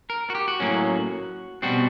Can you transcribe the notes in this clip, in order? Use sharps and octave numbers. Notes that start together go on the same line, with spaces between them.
A#4
F#4
G4
F#4
A2 F#3 A#3 C#4
B2 G3 C4 F#4